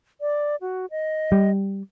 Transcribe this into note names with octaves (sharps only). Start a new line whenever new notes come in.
D5
F#4
D#5
G3